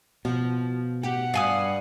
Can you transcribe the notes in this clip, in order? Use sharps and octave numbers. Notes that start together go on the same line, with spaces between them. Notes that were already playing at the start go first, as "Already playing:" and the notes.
B2 F3
G4 F#5
G2 F5 G#5 D#6